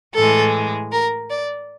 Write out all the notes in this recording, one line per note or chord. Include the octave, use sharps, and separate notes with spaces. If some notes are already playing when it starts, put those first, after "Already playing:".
A2 E3 G#3 A4
A#4
D5